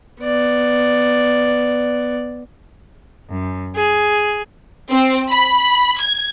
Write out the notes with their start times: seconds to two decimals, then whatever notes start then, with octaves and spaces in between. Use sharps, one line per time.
0.21 B3 D5
3.29 F#2
3.76 G#4
4.91 C4
5.30 B5
5.99 G#6